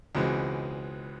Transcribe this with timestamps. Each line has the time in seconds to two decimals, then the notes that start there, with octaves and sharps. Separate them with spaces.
0.15 C#2 B2 E3 G#3 C4